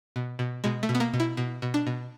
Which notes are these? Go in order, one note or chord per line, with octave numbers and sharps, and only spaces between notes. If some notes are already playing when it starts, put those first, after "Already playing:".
B2
B2
B2 G#3
A3
B2
B3
A#3
B2
E4
B2
B2
D4
B2